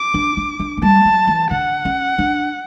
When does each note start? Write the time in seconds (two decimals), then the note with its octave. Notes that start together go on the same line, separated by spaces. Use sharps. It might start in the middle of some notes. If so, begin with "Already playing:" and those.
Already playing: D6
0.14 D4
0.37 D4
0.60 D4
0.77 A3
0.82 G3 A5
1.05 F#3
1.27 E3
1.51 D3 F#5
1.85 C#4
2.18 D4